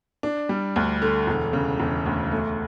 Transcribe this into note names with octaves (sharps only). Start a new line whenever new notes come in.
D4
G3
D2
D3
E1
C#3
E1
D2
A3